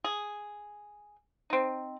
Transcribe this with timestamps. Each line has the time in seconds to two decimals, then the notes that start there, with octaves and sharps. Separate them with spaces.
0.04 G#4
1.50 C4 D#4